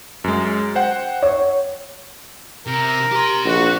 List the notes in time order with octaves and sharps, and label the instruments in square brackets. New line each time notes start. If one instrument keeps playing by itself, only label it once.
[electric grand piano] F#2 G#3
C5 F#5 G5
[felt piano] C#5
[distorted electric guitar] C3 [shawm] A#4
[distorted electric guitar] G4 C6
[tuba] A#1 [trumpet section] F#4